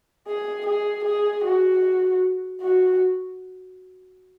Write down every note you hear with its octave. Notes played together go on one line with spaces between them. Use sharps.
G#4
G#4
G#4
F#4
F#4